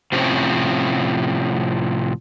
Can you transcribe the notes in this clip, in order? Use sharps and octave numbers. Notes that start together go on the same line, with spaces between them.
A2 C3 F3 C4 C#4